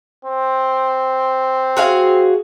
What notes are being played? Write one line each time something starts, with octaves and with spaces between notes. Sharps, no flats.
C4
F#4 G#4 F5